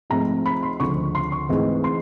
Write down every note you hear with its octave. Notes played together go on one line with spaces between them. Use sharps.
G#2 F3 A3 C4 A#5
B5
C6
D2 C#3 F3 C#6
C6
C#6
G#2 E3 A3 C4
C6